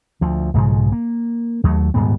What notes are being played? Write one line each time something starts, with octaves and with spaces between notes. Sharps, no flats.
D2 F3
B1 G#2 C#3 F3
A#3
D#2 F#3 A3
D#1 G#2 G3 B3